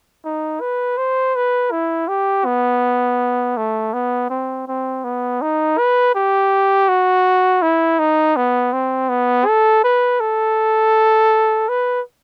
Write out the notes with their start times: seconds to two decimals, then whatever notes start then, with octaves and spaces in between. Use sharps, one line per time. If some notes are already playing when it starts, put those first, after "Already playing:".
0.25 D#4
0.61 B4
0.98 C5
1.36 B4
1.71 E4
2.08 G4
2.45 B3
3.57 A3
3.93 B3
4.30 C4
4.68 C4
5.04 B3
5.41 D#4
5.78 B4
6.15 G4
6.88 F#4
7.62 E4
7.99 D#4
8.36 B3
8.73 C4
9.09 B3
9.46 A4
9.84 B4
10.20 A4
11.69 B4